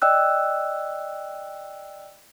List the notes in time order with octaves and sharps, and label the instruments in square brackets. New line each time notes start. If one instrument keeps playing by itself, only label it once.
[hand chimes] D5 D#5 G5 E6 F#6